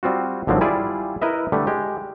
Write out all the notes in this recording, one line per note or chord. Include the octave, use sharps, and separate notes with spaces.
G3 C4 F4 F#4
G#1 D3 F3 F#3 C4
G3 E4 F4 G#4 D5 G#5
E4 A#4 B4 D#5 E5
D3 G3 A3
G#3 G4